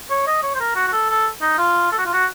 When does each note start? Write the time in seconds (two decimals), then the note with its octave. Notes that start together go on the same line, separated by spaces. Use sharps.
0.10 C#5
0.27 D#5
0.43 C#5
0.55 C5
0.60 A#4
0.76 F#4
0.88 F#4
0.93 A4
1.09 A4
1.42 D#4
1.58 F4
1.92 A4
1.99 F#4
2.06 F4
2.13 F#4